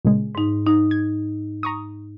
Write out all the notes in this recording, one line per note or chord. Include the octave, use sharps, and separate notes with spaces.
A#2 C#3 G#3
G#2 D#4
D#4
G#6
A#5 C#6 D#6